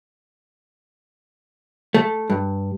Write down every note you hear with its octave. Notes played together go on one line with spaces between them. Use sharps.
A3
G2